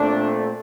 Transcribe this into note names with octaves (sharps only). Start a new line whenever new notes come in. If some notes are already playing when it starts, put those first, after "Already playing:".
Already playing: A#2 A3 C4 D4